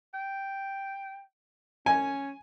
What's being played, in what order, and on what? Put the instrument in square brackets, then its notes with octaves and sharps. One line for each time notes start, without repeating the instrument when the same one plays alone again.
[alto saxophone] G5
[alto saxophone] C#4 [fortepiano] G#5